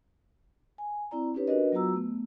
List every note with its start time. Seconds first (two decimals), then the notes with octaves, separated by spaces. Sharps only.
0.78 G#5
1.11 C4 E4 D5 A#5
1.34 C#4 D#4 G4 B4 C#5
1.48 D4 F#4 A#4 B4 D#5
1.72 F#3 B3 F4 F#4 A#5 E6
1.93 A3 B3